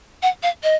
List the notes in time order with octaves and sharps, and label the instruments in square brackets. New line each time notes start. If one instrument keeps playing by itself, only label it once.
[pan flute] F#5
F5
D#5